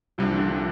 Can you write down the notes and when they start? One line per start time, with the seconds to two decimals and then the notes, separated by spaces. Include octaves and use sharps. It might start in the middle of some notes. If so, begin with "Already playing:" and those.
0.18 C2 C3 F3 G3 D4
0.28 E3
0.38 D3 F3
0.49 D3 F3